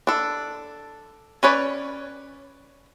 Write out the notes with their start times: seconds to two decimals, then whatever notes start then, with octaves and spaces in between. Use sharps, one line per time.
0.07 D4 A4
1.43 C#4 B4 C#5 D5